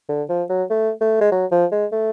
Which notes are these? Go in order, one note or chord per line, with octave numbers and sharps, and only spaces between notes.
D3
F3
F#3
A3
A3
G#3
F#3
F3
G#3
A3